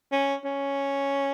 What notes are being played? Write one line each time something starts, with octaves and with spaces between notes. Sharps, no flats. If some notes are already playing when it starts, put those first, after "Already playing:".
C#4
C#4